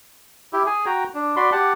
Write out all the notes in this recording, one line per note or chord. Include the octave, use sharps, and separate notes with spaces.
E4 G4
G#4 G#5
F#4 G5 A#5
D4
F#4 D5 B5 C6
G4 F#5 A5